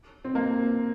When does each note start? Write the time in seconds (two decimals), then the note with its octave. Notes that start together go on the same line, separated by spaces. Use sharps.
0.25 C4
0.35 A#3